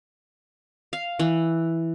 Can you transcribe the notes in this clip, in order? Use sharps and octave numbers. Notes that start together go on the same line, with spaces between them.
F5
E3